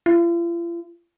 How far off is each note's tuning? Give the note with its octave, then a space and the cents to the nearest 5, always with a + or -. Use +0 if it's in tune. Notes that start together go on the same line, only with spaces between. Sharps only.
F4 -45